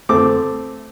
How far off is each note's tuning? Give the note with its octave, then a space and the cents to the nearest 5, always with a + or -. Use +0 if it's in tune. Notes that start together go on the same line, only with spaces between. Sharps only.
A3 +0 C4 +0 D6 +0